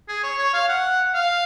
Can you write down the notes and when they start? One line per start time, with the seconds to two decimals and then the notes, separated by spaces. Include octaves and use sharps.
0.08 G#4
0.23 C#5
0.38 C#5
0.54 F5
0.69 F#5
1.14 F5